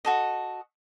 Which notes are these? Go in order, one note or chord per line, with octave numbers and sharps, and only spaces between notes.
F#4 A4 D#5